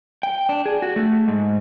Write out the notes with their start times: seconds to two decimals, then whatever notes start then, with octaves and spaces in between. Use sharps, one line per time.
0.23 G5
0.49 D4
0.66 G#4
0.82 F#4
0.96 A3
1.28 G#2